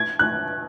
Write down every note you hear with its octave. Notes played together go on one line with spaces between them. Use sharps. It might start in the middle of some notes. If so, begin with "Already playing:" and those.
Already playing: G#6
F#6